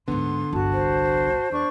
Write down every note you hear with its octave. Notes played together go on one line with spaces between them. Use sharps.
D2 G#2 D3 B3 C6
G1 C2 F#4 A5
C5
E2 D4 C#6